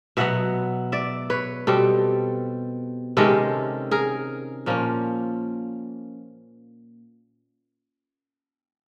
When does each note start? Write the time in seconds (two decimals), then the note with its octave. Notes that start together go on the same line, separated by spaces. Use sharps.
0.17 B2 F#3 B3 E5 F#5
0.92 D5 E5
1.30 B4 C#5
1.67 B2 G3 C4 G4 A4
3.17 C3 D#3 G#3 C#4 G4 A4
3.91 G#4 A#4
4.66 A#2 F3 A#3 C#4